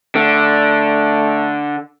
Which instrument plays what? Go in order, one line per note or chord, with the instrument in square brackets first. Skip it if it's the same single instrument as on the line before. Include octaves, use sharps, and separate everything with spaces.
[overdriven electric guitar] D3 [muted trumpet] A3